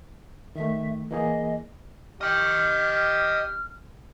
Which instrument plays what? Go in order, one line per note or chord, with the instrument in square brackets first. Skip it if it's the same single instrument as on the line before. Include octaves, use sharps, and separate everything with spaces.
[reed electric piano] D#3 A3 [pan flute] E5
[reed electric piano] E3 A#3 G#4 [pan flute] D#5
[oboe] G4 [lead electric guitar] D#5 G5 [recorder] F6